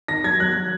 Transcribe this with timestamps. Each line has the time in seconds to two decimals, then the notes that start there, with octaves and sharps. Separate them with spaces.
0.08 D#3 A#6
0.24 F#3 G#6
0.40 F#3 F#6
0.55 F#3